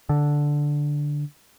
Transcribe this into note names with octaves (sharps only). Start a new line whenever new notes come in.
D3